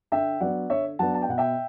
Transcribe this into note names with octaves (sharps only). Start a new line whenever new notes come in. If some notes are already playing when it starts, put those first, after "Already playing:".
D3 E5 G5
F#3 B3 D4 D5 F#5
D3 C#5 E5
F#3 B3 D4 F#5 A5
A5
G5
B2 F#5
E5 G5